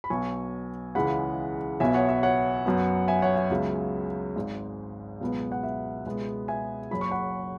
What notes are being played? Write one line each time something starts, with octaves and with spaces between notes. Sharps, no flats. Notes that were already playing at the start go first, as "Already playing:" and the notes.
B5
B1 B2 F#3 B3 G#5 C#6
C#2 C#3 E3 G#3 F#5 B5
B1 B2 B3 E5 G#5
C#5 F#5
E5
C#5 F#5
F#2 F#3 B3
E5 G#5
C#5 F#5
E5
C#2 C#3 F#3 B3
G#1 G#2 G#3
C#2 B2 F#3 B3
F#5
E5
C#2 B2 G#3 B3
E5 G#5
F#1 F#2 C#3 B5
C#6
F#5 B5